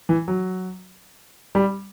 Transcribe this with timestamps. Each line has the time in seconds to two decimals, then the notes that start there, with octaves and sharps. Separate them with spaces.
0.09 E3
0.28 F#3
1.55 G3